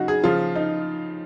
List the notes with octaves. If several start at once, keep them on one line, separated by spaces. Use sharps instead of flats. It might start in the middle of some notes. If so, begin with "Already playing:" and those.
Already playing: C#3 F#3 D#4 F#4
G#4
C#3 F3 F4
D#4